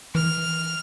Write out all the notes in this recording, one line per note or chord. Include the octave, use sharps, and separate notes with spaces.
E3 F6